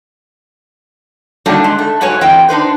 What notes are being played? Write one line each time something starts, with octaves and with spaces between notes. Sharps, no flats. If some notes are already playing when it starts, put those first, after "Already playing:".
F#3 G3 A3 A#3 D4 D#4
G#3
A3
G#2 F#3 B4 C#5 G#5
E3 C4 E4 D#5 G5
D4 D#4 B4 C5